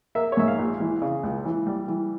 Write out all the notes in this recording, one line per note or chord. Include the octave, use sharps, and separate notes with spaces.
A#3 E5
C#5
G#2 E5
F5
A#1
E3
C#3
C#2
E3
G3
E3